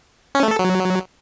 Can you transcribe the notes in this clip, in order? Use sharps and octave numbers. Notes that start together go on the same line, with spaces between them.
C#4
A3
A4
F#3